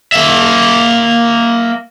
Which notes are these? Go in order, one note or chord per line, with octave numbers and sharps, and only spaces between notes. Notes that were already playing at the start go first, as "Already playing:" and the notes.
A#3 E5